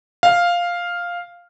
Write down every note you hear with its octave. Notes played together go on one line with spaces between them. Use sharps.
F5